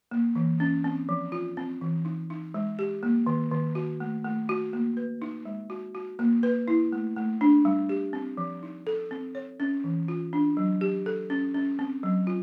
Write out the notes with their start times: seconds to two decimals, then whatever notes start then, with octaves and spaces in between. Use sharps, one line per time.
0.11 A#3
0.35 E3
0.60 C#4
0.84 C4
1.09 F3
1.32 F4
1.57 C4
1.81 E3
2.05 D#4
2.30 D#4
2.54 G#3
2.79 G4
3.03 A#3
3.26 D#3
3.51 D#3
3.75 F#4
4.00 A3
4.24 A3
4.49 F#4
4.73 A#3
4.97 B4
5.22 D#4
5.45 G#3
5.70 F#4
5.95 F#4
6.19 A#3
6.43 B4
6.68 E4
6.92 A3
7.16 A3
7.41 D4
7.65 G3
7.89 G4
8.13 C4
8.37 F3
8.63 D#4
8.87 A4
9.11 C4
9.35 C#5
9.60 C#4
9.84 E3
10.08 F4
10.33 D4
10.57 F#3
10.81 G4
11.06 A4
11.30 C#4
11.55 C#4
11.79 C4
12.03 F#3
12.27 F4